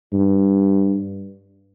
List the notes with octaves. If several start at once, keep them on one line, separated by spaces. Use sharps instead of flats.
G2